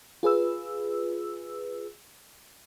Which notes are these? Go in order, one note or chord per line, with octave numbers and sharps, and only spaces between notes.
F4 G#4 B4 E6